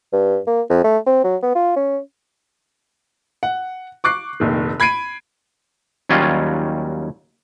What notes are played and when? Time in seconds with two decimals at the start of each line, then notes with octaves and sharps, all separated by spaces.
0.13 G2
0.47 A#3
0.70 F2
0.84 A3
1.06 C4
1.24 F#3
1.42 B3
1.55 F4
1.77 C#4
3.43 F#5
4.04 C#6 D6 F#6 C7
4.40 F1 A#1 D#3
4.80 B5 G#6 C7 D7 D#7
6.09 D#2 F#3 G3 C#4 F4 D#5